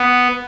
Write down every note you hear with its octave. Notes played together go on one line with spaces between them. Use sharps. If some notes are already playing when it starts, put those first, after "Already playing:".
Already playing: B3